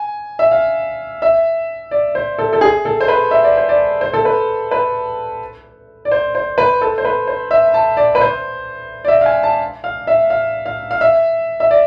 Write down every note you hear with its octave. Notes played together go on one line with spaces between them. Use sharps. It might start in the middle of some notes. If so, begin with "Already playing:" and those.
Already playing: G#5
E5
F5
E5
D5
C5
A4
A4
G#4
A4
C5
B4
E5
D5
C5
D5
C5
A4
B4
B4
D5
C5
C5
B4
A4
C5
B4
C5
E5
A5
D5
B4
C5
D5
E5
F5
G#5
A5
F5
E5
F5
F5
F5
E5
E5
D5